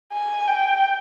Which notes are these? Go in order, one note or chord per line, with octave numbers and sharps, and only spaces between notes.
G#5
G5